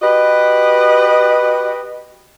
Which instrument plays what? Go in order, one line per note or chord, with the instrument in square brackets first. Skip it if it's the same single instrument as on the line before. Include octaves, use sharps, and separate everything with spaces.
[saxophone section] F#4 G4 B4 D#5